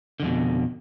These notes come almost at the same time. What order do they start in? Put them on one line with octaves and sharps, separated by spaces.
D3 F2 B2